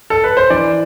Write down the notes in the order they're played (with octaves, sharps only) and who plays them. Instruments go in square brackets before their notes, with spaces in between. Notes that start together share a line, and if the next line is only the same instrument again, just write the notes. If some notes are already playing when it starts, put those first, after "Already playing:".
[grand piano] A4
B4
C5
[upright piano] E3 [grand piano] D5